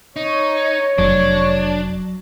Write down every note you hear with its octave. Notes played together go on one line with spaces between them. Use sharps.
D#4 C#5
F1 F#3 D4